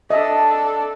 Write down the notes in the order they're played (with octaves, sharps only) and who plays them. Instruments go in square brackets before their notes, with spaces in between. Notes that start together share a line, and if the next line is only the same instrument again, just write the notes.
[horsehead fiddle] D4 A4 [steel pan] D#5 E5